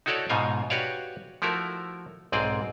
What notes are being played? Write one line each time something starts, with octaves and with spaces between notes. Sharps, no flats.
D#4 E4 F#4 A4 C#5 D5
G#2 B2 D#4 F4 F5 G#5
F#4 G4 B4 C#5 D5 F5
F3 A3 E4 F#4 A#4
B1 G#2 C4 G#4 D5